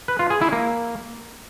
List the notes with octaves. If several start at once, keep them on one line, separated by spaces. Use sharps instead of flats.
B4
F4
G#4
E4
A#3